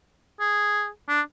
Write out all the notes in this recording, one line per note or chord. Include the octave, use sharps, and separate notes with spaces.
G#4
D4